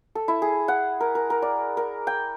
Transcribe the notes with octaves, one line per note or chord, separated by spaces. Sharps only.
A4
E4
G#4
F#5
A#4
A#4
A#4
D5
A#4
G5